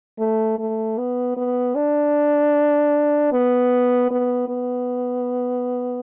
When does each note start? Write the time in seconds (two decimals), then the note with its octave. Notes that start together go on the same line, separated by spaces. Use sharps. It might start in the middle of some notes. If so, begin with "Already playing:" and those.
0.19 A3
0.59 A3
0.98 B3
1.37 B3
1.76 D4
3.33 B3
4.11 B3
4.49 B3